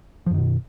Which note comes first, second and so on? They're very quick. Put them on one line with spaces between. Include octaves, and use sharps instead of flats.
F3 F#2 D#3 B2